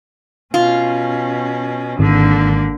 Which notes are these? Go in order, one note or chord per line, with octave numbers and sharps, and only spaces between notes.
B2 C#4 F4
G#1 D3 A#3